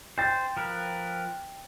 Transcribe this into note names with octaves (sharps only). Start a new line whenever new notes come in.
C5 G5 A6
F3 A#4 B4